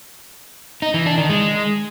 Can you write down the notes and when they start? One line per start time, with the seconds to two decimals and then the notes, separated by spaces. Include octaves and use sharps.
0.82 D#4
0.94 E3
1.06 D4
1.18 D#3
1.30 G#3